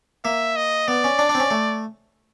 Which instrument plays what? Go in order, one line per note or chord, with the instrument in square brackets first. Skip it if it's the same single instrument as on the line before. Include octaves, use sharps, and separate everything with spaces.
[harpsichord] A#3 [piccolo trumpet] E5
[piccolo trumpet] D#5
[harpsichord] B3 [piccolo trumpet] D5
[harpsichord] C#4
D4
D4
C4
C#4
A3